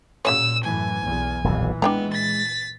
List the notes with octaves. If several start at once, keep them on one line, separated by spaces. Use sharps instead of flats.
A#2 C#3 F#3 C#5 E6
F#2 A2 E3 G#5
B1 E2
D#1 B1 F2 A#2 E3
G#3 B3 D4 G5 A#5
A6 B6